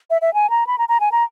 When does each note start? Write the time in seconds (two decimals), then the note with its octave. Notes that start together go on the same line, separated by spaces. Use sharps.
0.10 E5
0.22 E5
0.34 G#5
0.50 A#5
0.67 B5
0.78 A#5
0.89 A#5
1.00 G#5
1.12 A#5